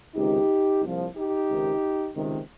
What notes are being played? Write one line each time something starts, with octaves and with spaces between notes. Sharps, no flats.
C#2 C3 D#3 D#4 G4
C2 A#2 F3
D#4 G4
C#2 C3 D#3
C#2 C3 D#3